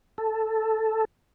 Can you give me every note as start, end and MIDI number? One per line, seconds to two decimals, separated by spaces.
0.18 1.05 69